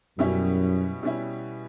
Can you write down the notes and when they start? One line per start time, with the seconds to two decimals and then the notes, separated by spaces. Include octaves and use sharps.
0.18 F#2 B2 G3 C#4 E4
1.03 B2 G3 C#4 E4